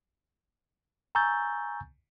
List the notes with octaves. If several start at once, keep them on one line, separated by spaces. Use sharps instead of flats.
G#5 A#5 C#6 E6 G6 A6